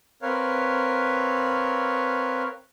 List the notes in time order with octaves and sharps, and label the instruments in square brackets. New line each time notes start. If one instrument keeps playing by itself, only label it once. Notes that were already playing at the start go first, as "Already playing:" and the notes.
[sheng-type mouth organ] C4 A#4 B4 C#5 F5